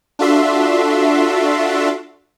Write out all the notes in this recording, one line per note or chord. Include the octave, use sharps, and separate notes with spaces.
D4 F4 F#4 A4 E5 C6